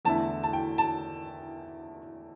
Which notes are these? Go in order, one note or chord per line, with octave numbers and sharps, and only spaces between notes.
E2 D3 A3 E4 A5
A5
G5
A5